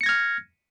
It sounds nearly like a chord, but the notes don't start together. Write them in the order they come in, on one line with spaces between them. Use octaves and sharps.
C#7 A#6 G#6 F6